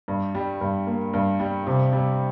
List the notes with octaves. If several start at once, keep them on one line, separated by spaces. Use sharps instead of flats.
G2
G3
G2
A#3
G2
G3
C3
G3